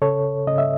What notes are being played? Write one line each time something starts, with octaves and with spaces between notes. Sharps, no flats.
C#3 A4 C#5
C#3 D#5
E5